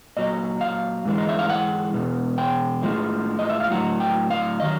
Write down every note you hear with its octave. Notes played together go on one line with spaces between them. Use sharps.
A#2 F#3 D#5
F5
G#2 E3 G#3
D#5
E5
F5
F#5
E2 B2
G5
A2 F3 G#3
D#5
E5
F5
A2 F#3 F#5
G5
F5
D#3 F#3 D#5